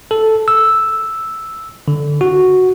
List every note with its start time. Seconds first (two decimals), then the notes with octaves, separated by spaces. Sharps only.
0.11 A4
0.48 E6
1.88 D3
2.21 F#4